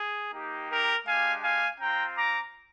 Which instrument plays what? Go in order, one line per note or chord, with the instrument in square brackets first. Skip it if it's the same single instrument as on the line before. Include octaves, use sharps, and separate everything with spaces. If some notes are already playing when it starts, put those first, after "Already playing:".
Already playing: [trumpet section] G#4
A#3 D#4 G4
G4 A#4
G#3 D4 G4 F5 G#5
F5 G#5
C4 F4 G5 A#5
A#5 D6